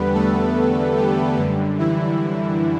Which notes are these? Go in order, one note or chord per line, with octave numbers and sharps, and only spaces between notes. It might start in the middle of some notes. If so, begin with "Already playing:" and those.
Already playing: E2 D3 G3 B3 B4
A3 A4
G3 G4
F#2 D3 G3
E3 E4